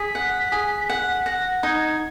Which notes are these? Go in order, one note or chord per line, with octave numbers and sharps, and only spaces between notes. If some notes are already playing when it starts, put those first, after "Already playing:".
Already playing: G#4 B6
F#5
G#4
F#5
F#5 A#6
D#4 G#6